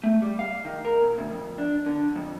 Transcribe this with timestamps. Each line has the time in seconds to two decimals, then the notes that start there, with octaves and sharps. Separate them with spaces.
0.03 A3
0.22 G3
0.39 F5
0.65 D#3
0.85 A#4
1.02 A#2
1.18 D2
1.30 F2
1.58 D4
1.86 D3
2.16 F2